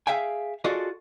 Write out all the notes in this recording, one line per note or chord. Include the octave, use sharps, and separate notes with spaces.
G#4 E5 F5 G5 G#5
F4 F#4 G#4 A4 D5 D#5